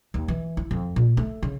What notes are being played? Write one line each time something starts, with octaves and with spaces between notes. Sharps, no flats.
D#2
E3
E4
F2
A#2
A3
C#3